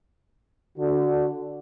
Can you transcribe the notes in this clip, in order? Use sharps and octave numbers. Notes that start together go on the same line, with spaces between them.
D3 F#4